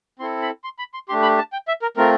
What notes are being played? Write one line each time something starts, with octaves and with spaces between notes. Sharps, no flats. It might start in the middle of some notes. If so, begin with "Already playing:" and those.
C4 E4 A4 C6
B5
C6
B5
C6
A3 D4 G4 C6
B5
A5
G5
E5
A#4
A3 C4 F4 A#4